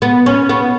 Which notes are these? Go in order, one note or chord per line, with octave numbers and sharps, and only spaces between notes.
B3
C#4
B3